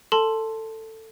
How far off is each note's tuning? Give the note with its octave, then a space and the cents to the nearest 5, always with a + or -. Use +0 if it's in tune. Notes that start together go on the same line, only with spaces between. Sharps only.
A4 +15 A5 +0 C6 +0